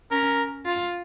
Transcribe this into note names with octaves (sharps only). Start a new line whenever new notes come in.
C#4 A#4
F4